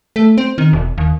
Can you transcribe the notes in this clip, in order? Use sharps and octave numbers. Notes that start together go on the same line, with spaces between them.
A3
C4
D#3
E1
D#2